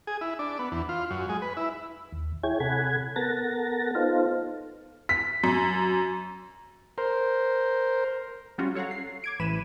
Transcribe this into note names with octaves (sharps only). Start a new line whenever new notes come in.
G#4
E4
D4
B3
E2
F4
F#2
G#3
B4
E4
D#2
E4 G#4 C#5 G5 G#6
C3 A4 F#5 G#5 B5 G#6
B3 A4 A#4 F#5 A6 A#6
B3 D#4 F4 A4 C5 F5
B6
F#2
A#4 C5
F#3 G3 C#4 F4 F#4
A4 C#5 F5 F#5 A#5
C7
D6 G#6 D7
A1 E3 B4 B5 D#7 E7